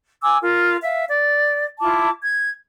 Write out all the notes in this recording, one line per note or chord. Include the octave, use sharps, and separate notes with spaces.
G#5 D6 E6
F4 A#4
E5 F5
D5
E4 F4 A5 D6
G#6